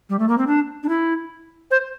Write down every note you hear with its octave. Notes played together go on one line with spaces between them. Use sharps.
G3
A3
A#3
C4
D4
D4
E4
C5